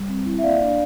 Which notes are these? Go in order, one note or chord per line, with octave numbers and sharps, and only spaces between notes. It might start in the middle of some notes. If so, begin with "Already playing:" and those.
Already playing: G3
C4
E4
E5
A#3 D5 F5
D4